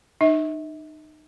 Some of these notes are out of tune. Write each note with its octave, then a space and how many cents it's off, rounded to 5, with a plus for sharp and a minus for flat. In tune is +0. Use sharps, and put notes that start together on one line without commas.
D#4 -30 E5 -40